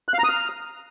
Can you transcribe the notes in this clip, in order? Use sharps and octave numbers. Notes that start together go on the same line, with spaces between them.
F#6
F5
A#5
D#6
F6